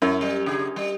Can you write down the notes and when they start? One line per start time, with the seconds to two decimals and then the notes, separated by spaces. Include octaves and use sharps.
0.02 F#2 E4
0.21 G3
0.46 C#3 G#4
0.76 G3